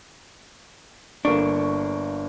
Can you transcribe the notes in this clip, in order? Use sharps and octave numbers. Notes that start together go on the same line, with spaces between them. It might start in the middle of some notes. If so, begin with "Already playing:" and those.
G1 A#3 D4 C#6